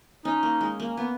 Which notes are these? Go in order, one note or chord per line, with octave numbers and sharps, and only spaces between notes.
C#4 D#4
A#3
G#3
A#3
B3